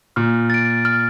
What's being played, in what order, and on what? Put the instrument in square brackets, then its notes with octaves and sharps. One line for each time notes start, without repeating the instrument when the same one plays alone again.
[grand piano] A#2 [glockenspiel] F6
[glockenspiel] A6 D7
F6